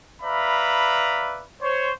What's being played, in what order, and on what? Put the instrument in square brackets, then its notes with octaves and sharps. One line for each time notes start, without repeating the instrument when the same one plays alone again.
[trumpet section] B4 D5 E5 F5 A#5 B5
C5 C#5